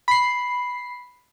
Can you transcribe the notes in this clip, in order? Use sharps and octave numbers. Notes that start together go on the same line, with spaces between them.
B5 C7